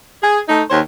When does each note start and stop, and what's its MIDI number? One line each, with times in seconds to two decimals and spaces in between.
0.22 0.39 68
0.49 0.62 57
0.49 0.62 63
0.70 0.80 39
0.70 0.80 72
0.70 0.80 73